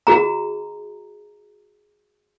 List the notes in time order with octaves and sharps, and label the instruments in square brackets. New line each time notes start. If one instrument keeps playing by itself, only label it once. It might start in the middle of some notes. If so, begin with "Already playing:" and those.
[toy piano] F#4 G#4 A#5